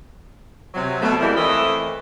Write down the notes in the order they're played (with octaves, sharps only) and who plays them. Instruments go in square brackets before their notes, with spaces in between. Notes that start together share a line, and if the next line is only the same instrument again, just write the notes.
[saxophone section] C3 F#3
B2 A3
F2 E3 G3 G#3 A#3 E4
E3 A3 A#3 C4 D#5 E5